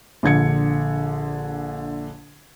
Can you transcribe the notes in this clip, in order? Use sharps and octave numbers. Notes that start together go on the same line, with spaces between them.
A#1 D3 G#6 C#7